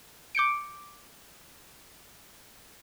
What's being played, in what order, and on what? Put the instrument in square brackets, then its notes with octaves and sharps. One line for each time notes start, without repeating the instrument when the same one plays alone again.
[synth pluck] D6 G6 C#7 D7